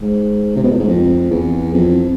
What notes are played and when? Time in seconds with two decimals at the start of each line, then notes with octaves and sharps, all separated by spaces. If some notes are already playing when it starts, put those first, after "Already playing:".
0.02 G#2
0.56 C3
0.64 B2
0.72 A2
0.80 G#2
0.88 F2
1.30 E2
1.74 F2